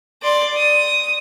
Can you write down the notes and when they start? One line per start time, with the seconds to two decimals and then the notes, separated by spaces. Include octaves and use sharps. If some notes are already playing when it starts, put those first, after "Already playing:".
0.22 D5 C6
0.57 D#6